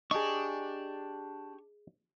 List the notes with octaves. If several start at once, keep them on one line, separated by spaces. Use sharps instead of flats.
D4 G4 G#4 D#5 C#6